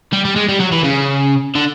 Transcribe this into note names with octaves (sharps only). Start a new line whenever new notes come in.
G3
G3
G#3
G3
F#3
E3
C#3
D3